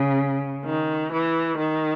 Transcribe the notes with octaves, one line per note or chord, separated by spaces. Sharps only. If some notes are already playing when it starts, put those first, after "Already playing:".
Already playing: C#3
D#3
E3
D#3